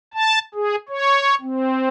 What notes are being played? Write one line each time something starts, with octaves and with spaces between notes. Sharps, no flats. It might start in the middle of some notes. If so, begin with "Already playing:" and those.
A5
G#4
C#5
C4